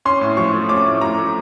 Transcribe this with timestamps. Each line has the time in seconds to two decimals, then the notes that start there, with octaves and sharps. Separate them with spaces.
0.05 C#4 C6
0.21 A2
0.37 F3 C#6
0.53 A3
0.69 C#4 D6
0.86 A2
1.01 F3 A#5
1.18 A3